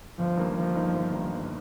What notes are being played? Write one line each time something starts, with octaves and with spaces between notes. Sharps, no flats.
G1 F3
G2 D#3 A#3 D#4
G1 F3
G2 D#3 A#3 D#4
G1
G2 D#3 A#3 D#4
G1